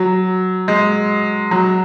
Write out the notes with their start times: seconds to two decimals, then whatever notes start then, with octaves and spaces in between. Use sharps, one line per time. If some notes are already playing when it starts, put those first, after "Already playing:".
Already playing: F#3
0.68 G#3
1.51 F#3